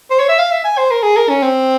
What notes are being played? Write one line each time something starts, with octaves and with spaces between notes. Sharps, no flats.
C5
C#5
E5
F5
E5
G#5
C5
A#4
G#4
A#4
C#4
C4